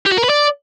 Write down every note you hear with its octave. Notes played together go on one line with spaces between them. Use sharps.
G4
F#4
A#4
B4
D5